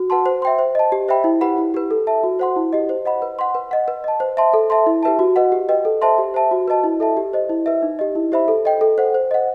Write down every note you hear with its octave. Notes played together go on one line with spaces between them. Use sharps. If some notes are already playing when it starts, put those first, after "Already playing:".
Already playing: F#4
B4 F#5 A5 C6
C5
E5 G5 C6
C5
D#5 A5
G4
C5 E5 G5 B5
E4
G4 B4 F#5 B5
E4
G4 B4
A4
E5 A5
F#4
C5 F#5 C6
E4
G4 D#5
C5
D#5 F#5 B5
B4
F#5 C6
B4
D#5 F#5
B4
D#5 A5
C5
E5 A5 C6
A4
E5 A5 C6
E4
G4 B4 E5 A5
F#4
B4 D#5 F#5
G4
B4 D#5 G5
A4
C5 E5 A5 C6
G4
C5 E5 A5
F#4
B4 D#5 A5
E4
A4 E5 A5
G4
C5 D#5
E4
B4 E5
D#4
G4 D#5
E4
G4 C5 E5 B5
A4
D#5 G5
A4
C5 F#5
C5
D#5 F#5